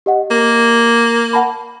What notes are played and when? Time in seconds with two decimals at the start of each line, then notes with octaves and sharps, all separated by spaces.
0.06 G4 D#5 F#5
0.31 A#3
1.33 F#5 A5 B5